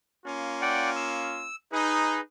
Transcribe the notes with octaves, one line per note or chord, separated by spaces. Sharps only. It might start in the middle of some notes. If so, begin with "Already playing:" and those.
A#3 C#4 F4
D5 F#5 G5
E6
D#4 G#4 B4